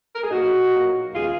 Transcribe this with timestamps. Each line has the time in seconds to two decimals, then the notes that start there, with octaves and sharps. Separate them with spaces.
0.16 A#4
0.23 G#4
0.31 A#2 F#3 A#3 D#4 F#4
0.72 A#2 F#3 A#3
1.13 D#2 C#3 G#3 B3 F4 G#4